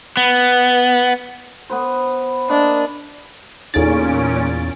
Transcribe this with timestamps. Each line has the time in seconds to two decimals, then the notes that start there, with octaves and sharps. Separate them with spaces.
0.17 B3
1.70 B3 B4 C5
2.49 A#3 D4 B4 D#5
3.74 E2 A#2 C#4 D#4 G#4 A4 A6 D7